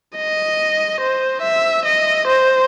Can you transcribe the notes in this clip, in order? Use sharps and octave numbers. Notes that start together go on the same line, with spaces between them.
D#5
C5
E5
D#5
C5